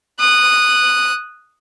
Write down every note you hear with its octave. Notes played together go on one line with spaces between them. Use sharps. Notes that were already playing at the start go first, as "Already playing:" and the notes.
D#6 F#6